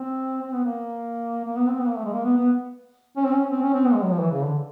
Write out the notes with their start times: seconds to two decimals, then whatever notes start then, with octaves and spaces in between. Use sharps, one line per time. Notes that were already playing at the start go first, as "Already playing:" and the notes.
Already playing: C4
0.42 C4
0.53 B3
0.65 A#3
1.45 A#3
1.56 B3
1.68 C4
1.79 B3
1.88 A#3
1.96 A3
2.05 G#3
2.13 A#3
2.25 B3
2.37 B3
3.17 C#4
3.25 C4
3.34 C#4
3.51 C4
3.62 C#4
3.74 C4
3.85 B3
3.94 G#3
4.03 F#3
4.11 F3
4.20 E3
4.31 C#3
4.42 D3